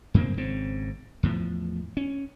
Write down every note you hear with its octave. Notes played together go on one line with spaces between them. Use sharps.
F#2 C#3 A#3 C4
G#1 G#2 C#3 C4
E2 A2 F3
C#4